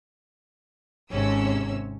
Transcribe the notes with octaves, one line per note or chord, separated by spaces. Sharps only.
G#1 C3 C#4 E6